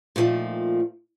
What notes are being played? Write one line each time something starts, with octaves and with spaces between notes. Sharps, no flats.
A#2 D#3 F3 A3